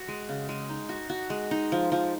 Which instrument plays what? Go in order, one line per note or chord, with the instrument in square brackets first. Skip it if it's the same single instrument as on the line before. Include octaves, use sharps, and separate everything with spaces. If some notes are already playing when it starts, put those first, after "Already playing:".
Already playing: [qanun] F#4
G#3
C#3
G#3
D#4
F#4
F#4
G#3
D#4
F3
F3